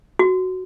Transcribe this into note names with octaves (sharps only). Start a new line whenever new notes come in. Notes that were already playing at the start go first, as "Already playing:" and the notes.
F#4